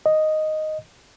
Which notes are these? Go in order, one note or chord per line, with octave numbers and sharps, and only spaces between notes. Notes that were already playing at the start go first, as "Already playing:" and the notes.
D#5